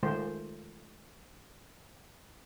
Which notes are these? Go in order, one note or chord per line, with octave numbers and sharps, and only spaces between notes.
D#3 G#3 A3 C#4 F4 C5